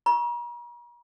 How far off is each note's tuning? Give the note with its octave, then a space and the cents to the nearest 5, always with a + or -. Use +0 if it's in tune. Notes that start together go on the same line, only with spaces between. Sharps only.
A#5 +45 C#6 +0 E6 +0